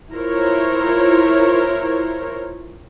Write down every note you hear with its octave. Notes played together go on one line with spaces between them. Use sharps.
E4 F4 A#4 C5 C#5